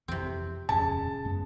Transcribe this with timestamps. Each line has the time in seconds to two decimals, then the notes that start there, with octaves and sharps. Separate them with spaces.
0.08 F2 C3 E3 C4
0.69 D#1 F2 C#3 A5
1.25 F#2 G#3 B3